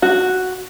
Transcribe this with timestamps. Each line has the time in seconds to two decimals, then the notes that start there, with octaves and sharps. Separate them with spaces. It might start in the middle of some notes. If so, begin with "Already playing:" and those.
0.02 F#4